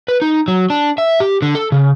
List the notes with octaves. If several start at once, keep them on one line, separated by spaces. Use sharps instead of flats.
B4
D#4
F#3
D4
E5
G4
D3
A4
C#3